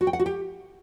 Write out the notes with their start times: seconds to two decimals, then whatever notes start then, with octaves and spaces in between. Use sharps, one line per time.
0.01 F#4
0.07 G5
0.13 F#5
0.20 F#4
0.26 G4